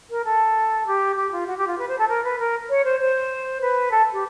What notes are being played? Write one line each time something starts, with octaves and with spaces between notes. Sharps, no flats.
A#4
A4
G4
G4
F4
F#4
G4
F4
B4
C5
A4
A#4
B4
A#4
C#5
C5
C5
B4
A4
G4